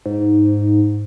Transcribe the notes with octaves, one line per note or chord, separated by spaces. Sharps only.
G#2